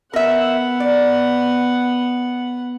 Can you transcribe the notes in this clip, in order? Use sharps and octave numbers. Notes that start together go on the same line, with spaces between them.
B3 A#4 E5 F#5
D5